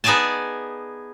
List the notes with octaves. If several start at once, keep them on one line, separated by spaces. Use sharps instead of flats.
B3 D#4 G#4 D5 G#5 A5